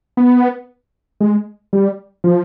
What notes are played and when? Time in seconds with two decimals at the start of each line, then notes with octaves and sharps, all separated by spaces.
0.17 B3
1.21 G#3
1.73 G3
2.24 F3